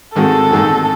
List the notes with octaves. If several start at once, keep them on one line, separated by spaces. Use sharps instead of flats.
G#2 D#3 G#3 C4 F#4 A4
G#2 D#3 G#3 C4 F#4